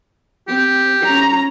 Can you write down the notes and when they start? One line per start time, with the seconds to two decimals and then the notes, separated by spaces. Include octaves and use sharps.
0.48 C4 G4
1.04 C#4 A#5